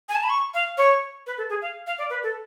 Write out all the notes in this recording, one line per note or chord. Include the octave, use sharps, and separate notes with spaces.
G#5
A5
B5
C#6
F5
C#5
B4
A4
G#4
F5
F5
D5
B4
A4